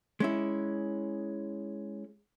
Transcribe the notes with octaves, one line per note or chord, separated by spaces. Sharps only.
G#3 C#4 E4